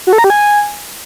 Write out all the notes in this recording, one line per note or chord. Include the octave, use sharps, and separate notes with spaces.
F#4
A4
A#5
G4
G#5